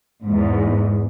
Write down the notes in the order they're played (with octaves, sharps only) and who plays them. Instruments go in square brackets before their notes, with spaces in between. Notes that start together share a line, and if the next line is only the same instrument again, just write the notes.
[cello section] E2 G#2